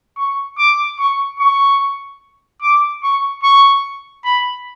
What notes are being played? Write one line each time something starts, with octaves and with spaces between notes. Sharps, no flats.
C#6
D6
C#6
C#6
D6
C#6
C#6
B5